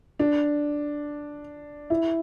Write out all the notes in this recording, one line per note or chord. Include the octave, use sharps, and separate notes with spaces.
D4
E4